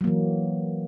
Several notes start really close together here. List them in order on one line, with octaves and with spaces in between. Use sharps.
F#3 A#3 E3